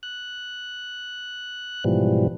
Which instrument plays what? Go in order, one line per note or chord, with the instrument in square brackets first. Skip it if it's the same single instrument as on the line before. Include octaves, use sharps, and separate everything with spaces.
[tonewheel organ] F#6
G#2 B2 E3 F3 G3